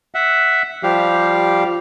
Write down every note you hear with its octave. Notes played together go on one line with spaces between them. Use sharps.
E5 F#5
F3 G3 G4 F5